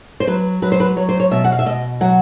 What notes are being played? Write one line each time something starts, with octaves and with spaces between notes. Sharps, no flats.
C5
F#3 B4
F#3 B4
C5
B4
F#3 C#5
C5
C#5
B2 E5
F#5
F5
E5
B2 D#5
F#3 F#5